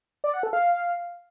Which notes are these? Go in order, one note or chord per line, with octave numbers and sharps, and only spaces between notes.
D5
F#5
A4
F5